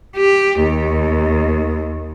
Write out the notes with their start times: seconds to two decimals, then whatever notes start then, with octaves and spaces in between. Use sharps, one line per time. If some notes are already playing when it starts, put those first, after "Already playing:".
0.17 G4
0.62 D#2